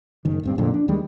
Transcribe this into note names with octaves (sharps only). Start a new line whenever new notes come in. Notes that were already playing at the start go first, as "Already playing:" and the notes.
F#1 D#3
D1 G2 C4
A#1 F2 A#2 D3
D4
D#2 D#3 G3 G#3